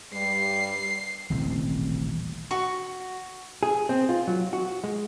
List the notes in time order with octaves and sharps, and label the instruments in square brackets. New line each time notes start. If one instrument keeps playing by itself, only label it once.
[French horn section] G2 G3 [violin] C7
[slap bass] D#1 A1 C3 C4
[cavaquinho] F#4 C#6
[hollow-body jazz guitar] G#4
C4
F4
F#3
F#4
G#3